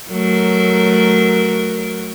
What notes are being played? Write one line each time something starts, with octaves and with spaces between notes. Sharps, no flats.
F#3 A3 A#4